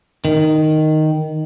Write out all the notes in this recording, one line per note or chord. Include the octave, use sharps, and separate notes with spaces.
D#3